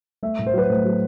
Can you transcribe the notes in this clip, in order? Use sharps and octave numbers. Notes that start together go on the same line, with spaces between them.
A3 E5
A2
C5
F#3 B4
A2 C5
F#3